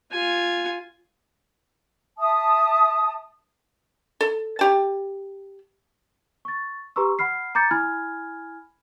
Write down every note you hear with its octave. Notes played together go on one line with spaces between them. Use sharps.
F4 G#5
E5 A5 D#6
A4
G4 A5
C#6 A6
G4 B4 A#5 C6 C#6 E6
F#5 B5 F6 C7
A#5 B5 D6 G6 A6 C#7
E4 G#5 B5 F6 G#6